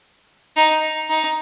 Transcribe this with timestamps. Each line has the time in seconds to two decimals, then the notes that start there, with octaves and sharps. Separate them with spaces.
0.57 D#4
1.10 D#4